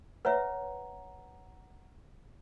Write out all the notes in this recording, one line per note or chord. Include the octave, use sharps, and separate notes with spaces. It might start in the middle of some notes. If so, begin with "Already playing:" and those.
B4 C#5 E5 F#5 A#5